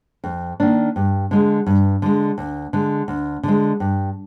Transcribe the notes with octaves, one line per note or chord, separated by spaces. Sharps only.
F2
D#3 A#3 D4
G2
D3 G#3
G2
D3 G#3
D2
D3 G#3
D2
D3 G#3
G2